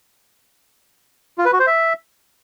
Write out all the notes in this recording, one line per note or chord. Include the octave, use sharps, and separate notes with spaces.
F4
B4
F#4
C5
E5